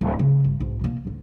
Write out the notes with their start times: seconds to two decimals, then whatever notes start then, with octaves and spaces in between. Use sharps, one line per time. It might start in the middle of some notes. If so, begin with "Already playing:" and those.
0.01 D1
0.19 C#3 A3
0.44 G1
0.60 B1 G#2
0.81 B2 A#3
1.05 A1 D2